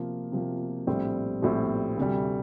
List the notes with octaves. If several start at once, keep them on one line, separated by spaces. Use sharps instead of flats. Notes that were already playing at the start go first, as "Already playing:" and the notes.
Already playing: C3 F3 A#3
C3 F3 A#3
A#1 A2 G3 C4
A#1 A2 G3 C4
D2 C3 G3